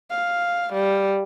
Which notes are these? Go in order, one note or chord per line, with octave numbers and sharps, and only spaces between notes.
F5
G3